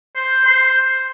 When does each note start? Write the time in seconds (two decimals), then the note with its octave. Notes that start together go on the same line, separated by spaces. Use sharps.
0.16 C5
0.45 C5